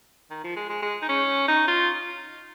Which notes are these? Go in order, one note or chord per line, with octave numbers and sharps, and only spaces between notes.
D#3
F3
G#3
G#3
G#3
D#4
C#4
D#4
F4